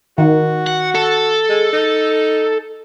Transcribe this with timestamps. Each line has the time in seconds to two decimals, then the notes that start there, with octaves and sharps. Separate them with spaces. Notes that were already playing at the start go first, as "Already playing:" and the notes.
0.18 D#3 F#4
0.67 F#5
0.95 A4
1.49 G#3
1.73 D#4